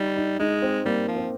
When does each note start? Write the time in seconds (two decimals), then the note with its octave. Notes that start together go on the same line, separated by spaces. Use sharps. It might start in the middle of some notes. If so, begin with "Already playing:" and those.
Already playing: G3 D#4
0.17 D#4
0.39 G#3 D#4
0.62 C4
0.85 G3 A#3
1.08 F3
1.16 C4